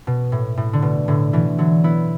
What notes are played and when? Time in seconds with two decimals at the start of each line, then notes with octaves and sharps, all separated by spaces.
0.07 B2
0.32 A2
0.57 A2
0.73 D3
0.82 B2
1.08 A2 D3
1.33 B2 E3
1.58 D3 F#3
1.84 B3 E4